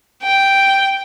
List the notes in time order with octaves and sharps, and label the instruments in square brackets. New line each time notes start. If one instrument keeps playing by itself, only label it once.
[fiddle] G5